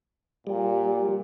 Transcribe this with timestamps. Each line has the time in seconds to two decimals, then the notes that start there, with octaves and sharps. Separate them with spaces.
0.47 A#2 G3